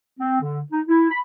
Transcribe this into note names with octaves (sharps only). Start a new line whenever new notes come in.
C4
D3
D#4
E4
B5